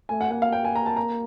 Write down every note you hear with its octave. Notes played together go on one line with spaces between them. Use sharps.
A3 G#5
F#5
A#3 F#5
F5
G5
G#5
A#5
A5
A#5